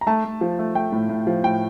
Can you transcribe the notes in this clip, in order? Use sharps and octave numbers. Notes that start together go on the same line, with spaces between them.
A#5
A3 A5
A3
F3
A3
A3 G5
A2
A2
F3
A2 G5